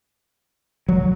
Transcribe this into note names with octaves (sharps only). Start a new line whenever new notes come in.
F#3